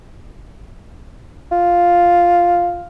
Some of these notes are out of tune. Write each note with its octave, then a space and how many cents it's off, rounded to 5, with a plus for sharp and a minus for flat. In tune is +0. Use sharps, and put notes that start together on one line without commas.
F4 +0